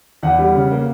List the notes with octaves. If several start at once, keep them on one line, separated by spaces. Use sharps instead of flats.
E2 F#5
G3
C#3
A#3